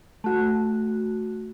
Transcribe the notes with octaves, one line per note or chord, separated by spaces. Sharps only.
A3 F#4